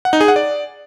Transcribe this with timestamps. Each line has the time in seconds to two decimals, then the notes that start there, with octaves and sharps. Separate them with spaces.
0.05 F#5
0.13 D#4
0.21 G#4
0.28 F#5
0.36 D5